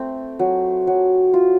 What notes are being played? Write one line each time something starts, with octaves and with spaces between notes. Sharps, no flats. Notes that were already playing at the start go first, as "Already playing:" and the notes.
Already playing: A3 C4
F#3
F#3
F4